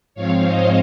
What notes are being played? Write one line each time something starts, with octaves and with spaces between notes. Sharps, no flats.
G#2 F3 C4 C#5 F5
C5 D#5